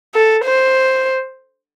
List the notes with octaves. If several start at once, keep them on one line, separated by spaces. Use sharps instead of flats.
A4
C5